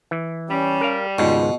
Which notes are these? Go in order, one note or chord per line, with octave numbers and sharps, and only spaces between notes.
E3
G3 C#4
A#4 F5
G#1 C#2 G#2 B2 F4